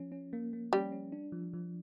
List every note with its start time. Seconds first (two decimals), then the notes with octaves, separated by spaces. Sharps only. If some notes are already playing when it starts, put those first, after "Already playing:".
Already playing: F3 C#4
0.12 C#4
0.33 A#3
0.53 A#3
0.73 G3 C#4
0.92 C#4
1.12 D4
1.32 F3
1.53 F3